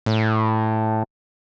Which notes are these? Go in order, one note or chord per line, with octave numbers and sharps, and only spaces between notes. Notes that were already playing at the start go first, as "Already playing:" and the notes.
A2